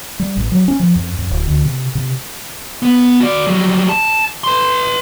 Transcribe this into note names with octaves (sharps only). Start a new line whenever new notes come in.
G3
A1
F#3
C#4
F3
F2
F2
D1
D2
C3
C3
B3
F#4 D5
F#3 G3
A5
B4 C6